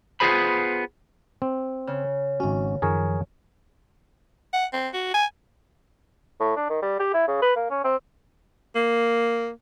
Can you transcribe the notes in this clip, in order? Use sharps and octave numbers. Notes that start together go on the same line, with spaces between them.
B3 F4 G#4 C5 B5
C4
C#3
G#1 C#4 F#4
F#2 D#3 F3 G#4 A#4 C#5
F#5
C4
F#4
G#5
A2
D4
D#3
G3
G4
E4
C#3
B4
A#3
C#4
C4
A#3